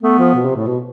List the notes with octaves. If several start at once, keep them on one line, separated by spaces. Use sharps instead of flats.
A3 B3
F3
B2
C3
A2
B2